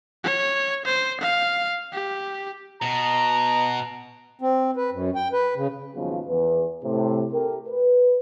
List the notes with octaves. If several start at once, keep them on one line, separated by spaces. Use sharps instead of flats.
C#5
C5
F5
G4
B2 A#5
C4
B4
F#2
G5
B4
C#3
D#2 G#2 C#3 F3 F#3 B3
E2 B4
A2 C3
A3 G4 A#4
B4